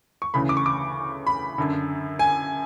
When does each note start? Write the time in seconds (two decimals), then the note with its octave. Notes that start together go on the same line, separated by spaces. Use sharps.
0.22 C#6
0.34 D2 C#3 E3 B5
0.49 D6
0.57 C#6
0.66 D6
1.27 B5
1.58 F#2 D3
2.19 G#5